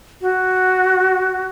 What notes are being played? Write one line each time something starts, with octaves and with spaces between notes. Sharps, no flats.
F#4